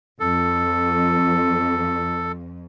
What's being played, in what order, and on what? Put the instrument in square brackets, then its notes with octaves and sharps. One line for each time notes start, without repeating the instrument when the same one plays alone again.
[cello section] F2 [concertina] A4